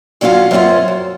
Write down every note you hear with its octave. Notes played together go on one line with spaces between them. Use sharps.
D3 F#3 C#4 F4 F5 F#5
F#2 A#2 C4 C#4 F4 F#5
F#3